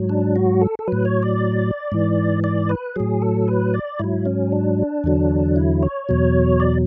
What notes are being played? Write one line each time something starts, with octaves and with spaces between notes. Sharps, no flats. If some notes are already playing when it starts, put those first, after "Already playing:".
Already playing: G#2 F#3
D4
F#4
A4
A4
A2 F#3 B4
C#5
D5
G#2 E3
D5
B4
A2 F#3 G#4
A4
B4
D5
G#2 F#3 E4
C#4
D4
E2 D3 F#3
E4
C#5
E2 B2 F#3
D5